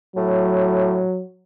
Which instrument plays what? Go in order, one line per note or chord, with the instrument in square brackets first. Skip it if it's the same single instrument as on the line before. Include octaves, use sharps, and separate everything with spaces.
[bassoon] A2 [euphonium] F#3